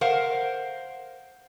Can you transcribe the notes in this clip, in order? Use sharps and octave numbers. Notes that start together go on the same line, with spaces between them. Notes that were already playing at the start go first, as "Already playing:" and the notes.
A#4 C5 F5 F#5